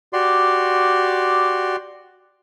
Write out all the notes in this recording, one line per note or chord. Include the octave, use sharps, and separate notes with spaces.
F#4 G4 D5 C6